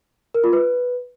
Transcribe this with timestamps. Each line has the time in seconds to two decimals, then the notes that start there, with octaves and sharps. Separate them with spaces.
0.34 A#4
0.44 F4
0.53 B4